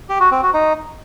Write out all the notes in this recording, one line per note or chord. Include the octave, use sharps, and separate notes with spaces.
G4
F#4
C4
F#4
D#4